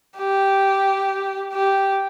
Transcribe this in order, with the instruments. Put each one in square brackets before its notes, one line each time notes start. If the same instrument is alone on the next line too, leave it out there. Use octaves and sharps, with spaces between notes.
[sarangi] G4
G4